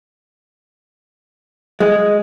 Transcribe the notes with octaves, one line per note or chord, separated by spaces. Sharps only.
G#3